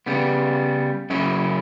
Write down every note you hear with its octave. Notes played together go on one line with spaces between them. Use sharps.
C#3 G3 B3
F#2 C#3 F#3 C#4 E4